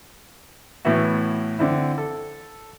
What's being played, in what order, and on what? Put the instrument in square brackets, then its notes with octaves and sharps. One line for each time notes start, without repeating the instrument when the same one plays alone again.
[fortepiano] A2 E3 B3 E4 F#4
D3 C4 E4
A4